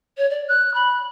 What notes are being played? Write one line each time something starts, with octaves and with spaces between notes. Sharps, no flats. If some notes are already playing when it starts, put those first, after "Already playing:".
C#5
D5
F#6
B5